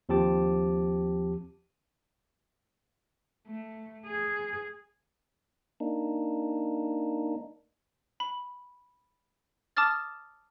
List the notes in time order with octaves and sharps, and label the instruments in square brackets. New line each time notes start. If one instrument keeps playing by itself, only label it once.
[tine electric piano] D#2 F3 C4 G4 A5 D6
[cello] A3
G#4
[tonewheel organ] A#3 D4 D#4
[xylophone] B5
A5 D6 D#6 F6 A6